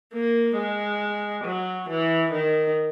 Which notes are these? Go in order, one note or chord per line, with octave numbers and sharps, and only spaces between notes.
A#3
G#3
F#3
E3
D#3